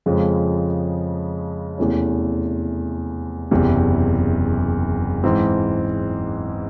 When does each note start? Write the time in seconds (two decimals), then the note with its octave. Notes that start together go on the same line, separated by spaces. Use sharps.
0.06 F2 C#3 F3 G#3
1.78 E2 C3 E3 A3 C#4
3.51 F#1 E2 C3
5.24 G#2 E3 G#3 C4